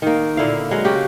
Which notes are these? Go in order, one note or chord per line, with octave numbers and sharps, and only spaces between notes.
D#3 A#3
A#2 D3 E4 F5
F#3 G#3 F5 F#5
C#3 F#4 G4